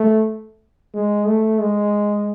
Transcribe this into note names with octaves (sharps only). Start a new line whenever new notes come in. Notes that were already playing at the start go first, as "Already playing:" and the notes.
Already playing: A3
G#3
A3
G#3